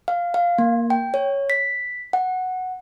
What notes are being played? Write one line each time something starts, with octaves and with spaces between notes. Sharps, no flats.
F5
F5
A#3
G5
C#5
B6
F#5